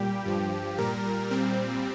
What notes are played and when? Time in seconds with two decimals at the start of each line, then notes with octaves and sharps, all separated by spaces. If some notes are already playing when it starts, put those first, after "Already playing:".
Already playing: A#2 G3 G4
0.26 G2 F3
0.78 A#2 G3 A#4
1.31 A#2 G3 C4